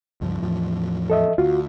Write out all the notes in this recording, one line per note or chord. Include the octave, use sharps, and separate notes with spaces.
C#2 G2 F3
E2 A2 F3
A4 D#5 E5
D2 F4 F#4